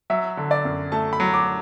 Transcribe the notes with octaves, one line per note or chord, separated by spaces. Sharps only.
F#3 E5
D3
D5
F#2
A3 A5
B5
F#3
D6